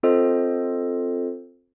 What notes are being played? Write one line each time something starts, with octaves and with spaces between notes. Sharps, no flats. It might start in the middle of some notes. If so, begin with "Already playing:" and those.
C4 F4 A4 C5 D#5